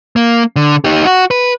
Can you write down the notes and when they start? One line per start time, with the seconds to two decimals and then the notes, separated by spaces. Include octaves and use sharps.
0.16 A#3
0.56 D3
0.84 D#4 G4
1.05 F#4
1.31 B4